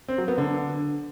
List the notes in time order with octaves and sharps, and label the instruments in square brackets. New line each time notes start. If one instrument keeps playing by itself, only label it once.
[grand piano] C4
F#3
B3
D3